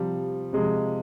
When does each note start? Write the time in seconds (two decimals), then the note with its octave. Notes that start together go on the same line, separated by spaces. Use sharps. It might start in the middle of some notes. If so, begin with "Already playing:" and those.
Already playing: C3 F3 G3
0.53 C3 F3 G#3